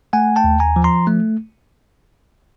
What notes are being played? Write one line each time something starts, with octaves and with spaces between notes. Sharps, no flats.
A3 F#5 G#5
G5 A5
D#2
G#5 A#5
F3
A#5 C6
A3